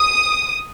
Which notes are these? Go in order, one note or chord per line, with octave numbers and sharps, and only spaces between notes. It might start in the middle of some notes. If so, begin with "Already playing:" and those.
Already playing: D#6